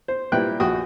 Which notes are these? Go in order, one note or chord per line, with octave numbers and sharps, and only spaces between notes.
C5
A#2 G3 E4 B4 G5 F#6
A#1 F#4 G5 D#6